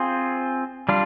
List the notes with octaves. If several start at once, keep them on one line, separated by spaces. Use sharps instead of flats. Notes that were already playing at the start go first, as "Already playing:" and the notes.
Already playing: C4 F4 G#4 C5
G3 D4 F4